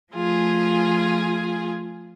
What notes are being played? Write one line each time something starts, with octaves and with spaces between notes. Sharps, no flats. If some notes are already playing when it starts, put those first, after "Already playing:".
F3 A3 F4 G#4 G#5